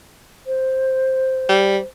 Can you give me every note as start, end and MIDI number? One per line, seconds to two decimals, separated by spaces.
0.46 1.84 72
1.49 1.78 55